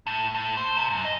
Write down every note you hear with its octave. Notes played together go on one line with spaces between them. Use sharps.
A2
A2
C5
C3
F#2
D#5